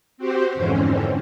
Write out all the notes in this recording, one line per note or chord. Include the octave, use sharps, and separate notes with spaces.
C4 F#4 G4 C5
F2 G#2 D3 E3 C4 C#4